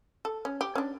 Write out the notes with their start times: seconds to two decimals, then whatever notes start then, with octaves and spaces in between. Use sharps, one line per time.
0.25 A4
0.45 C#4
0.61 G4
0.75 C#4 D4